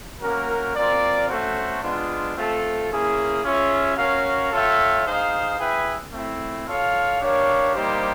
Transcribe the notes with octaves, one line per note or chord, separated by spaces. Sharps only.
A#3 C#4 F#4 A#4
C4 F4 A#4 D5
A3 C#4 F#4 A4 C5
G#3 B3 D4 F4
A3 C4 F4 A4
A#3 C#4 E4 G#4
C#4 F4 G#4 C#5 E5
C#4 F#4 A#4 C#5 F5
F4 A4 C#5 E5 G5
D#4 G#4 C5 F5
E4 G#4 B4 E5 G5
A3 C4 E4
F4 A4 C#5 F5
D4 G4 A#4 C#5 F5
G3 A#3 D#4 G4 C5